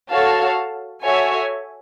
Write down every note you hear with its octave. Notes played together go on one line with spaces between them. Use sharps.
F#4 A4 C#5 F5 A5
F#4 A4 C#5 E5 G#5